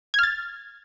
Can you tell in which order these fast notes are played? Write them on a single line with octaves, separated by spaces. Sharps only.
G#6 F6 A6